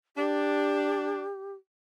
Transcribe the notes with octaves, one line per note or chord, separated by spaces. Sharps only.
D4 G4